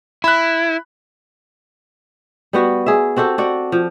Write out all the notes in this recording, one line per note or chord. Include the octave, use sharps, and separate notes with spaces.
E4 B5 F#6
G3 B3 F#4
G#4 E5
C4 F#4 G4 A4
F#4 D5 F#5
F3